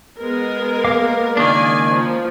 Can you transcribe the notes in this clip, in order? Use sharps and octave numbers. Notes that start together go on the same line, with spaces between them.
G#3 B3 A#4
A#3 F5 D6
C#2 D#3 D4 D5 G#5
F3